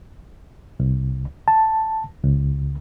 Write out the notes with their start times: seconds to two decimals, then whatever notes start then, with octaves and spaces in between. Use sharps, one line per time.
0.80 C2
1.48 A5
2.24 C#2